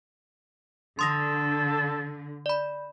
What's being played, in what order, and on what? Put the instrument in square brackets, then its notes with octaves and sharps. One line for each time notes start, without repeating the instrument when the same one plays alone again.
[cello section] D3 [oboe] A4 [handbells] C6 D#6 A#6
[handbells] D5 B5